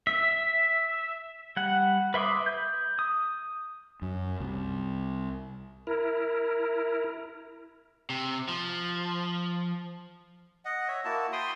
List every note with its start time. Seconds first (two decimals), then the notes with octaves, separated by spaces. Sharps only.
0.07 E5
1.57 G3 F#5
2.14 B4 E5 C6 D6 D#6
2.46 G6
2.99 D#6
4.02 F#2
4.40 C2
5.87 E4 A#4
8.10 C3
8.48 F3
10.65 D#5 F#5
10.88 C#5 E5
11.05 A#3 E4 F#4 A5
11.33 G5 B5 C6 D#6